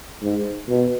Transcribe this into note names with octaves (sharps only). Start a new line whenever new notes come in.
G#2
B2